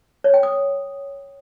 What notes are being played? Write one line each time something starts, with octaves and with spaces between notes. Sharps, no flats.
C#5
G5
D#6